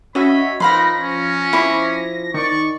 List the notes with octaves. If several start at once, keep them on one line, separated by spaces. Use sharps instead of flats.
C#4 F#4 C#5 D#5 E5 B5
F3 D#4 A#4 B4 F5 B5 C6 A#6
C#4
E4 C5 D6
D#3 D5 C#6